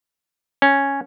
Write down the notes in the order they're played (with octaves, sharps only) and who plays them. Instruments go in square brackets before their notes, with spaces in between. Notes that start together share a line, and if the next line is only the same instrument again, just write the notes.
[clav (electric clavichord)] C#4